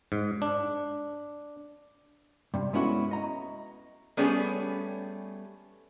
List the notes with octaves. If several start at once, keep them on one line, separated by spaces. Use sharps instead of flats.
G#2
D4
G2 C3
G#3 B3 C#4 E4 F#4 A4
D#5 A#5
G3 A3 B3 C#4 G4 G#4